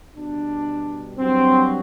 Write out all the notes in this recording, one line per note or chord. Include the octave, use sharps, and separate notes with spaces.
B2 G3 D4
G2 F#3 C4